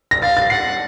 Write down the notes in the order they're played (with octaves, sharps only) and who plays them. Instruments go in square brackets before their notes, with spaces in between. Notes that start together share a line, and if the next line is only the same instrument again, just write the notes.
[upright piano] A#6
[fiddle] F5 [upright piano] A6
[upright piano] A6
[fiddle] F#5 [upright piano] C7